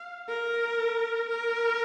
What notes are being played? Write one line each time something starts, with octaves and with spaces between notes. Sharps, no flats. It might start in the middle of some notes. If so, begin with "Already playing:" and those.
Already playing: F5
A#4
A#4